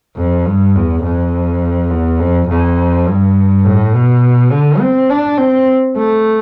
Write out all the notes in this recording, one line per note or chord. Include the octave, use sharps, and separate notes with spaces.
F2
G2
E2
F2
E2
F2
F2
G2
A2
B2
D3
C4
D4
C4
A3